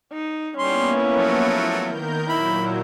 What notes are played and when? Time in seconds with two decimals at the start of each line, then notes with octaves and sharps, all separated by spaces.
0.13 D#4
0.58 G3 A#3 B3 C#4 E4 C6
1.12 F3 F#3 A3
1.79 D#3 A#4 G6
2.28 A#2 F#3 E4 B5